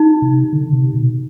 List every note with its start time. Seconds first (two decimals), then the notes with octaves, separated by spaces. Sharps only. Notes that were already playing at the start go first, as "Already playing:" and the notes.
Already playing: D#4
0.22 C3
0.53 D3
0.73 C3
0.94 B2